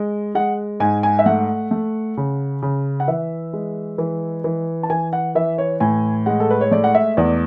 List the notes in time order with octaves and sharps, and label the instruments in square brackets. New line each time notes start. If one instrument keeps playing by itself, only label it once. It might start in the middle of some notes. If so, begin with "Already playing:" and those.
Already playing: [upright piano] G#3
G#3 F#5
G#2 G#5
G#5
E5
A3 F#5
A3
C#3
C#3
F#5
E3 E5
G#3
E3
E3
A5
E3 G#5
F#5
E3 E5
C#5
A2 G#5
G#3 F#5
A4
B4
C#5
A3 D5
F#5
E5
E2 D5